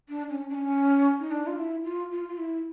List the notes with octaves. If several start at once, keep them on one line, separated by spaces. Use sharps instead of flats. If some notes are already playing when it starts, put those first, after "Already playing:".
D4
C#4
D4
C#4
D#4
D4
F4
E4
F4
F4
F4
E4